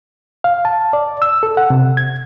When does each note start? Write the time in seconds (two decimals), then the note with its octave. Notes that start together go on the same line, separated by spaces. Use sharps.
0.44 F5
0.65 A5
0.93 D5
1.22 E6
1.43 A4
1.57 F#5
1.70 C3
1.97 G#6